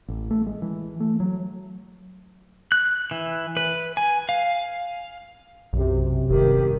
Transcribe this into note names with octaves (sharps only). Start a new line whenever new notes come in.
A1
A3
G#3
E3
A3
F#3
F#6
E3
B4
G#5
F5
B1 F#2 C3
F1 G2 D#3 G4